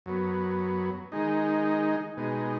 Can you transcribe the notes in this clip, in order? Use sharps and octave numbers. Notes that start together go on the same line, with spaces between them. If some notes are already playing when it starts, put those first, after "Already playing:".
F#2 F#3 B3
D#3 G#3 D#4
B2 G#3 D#4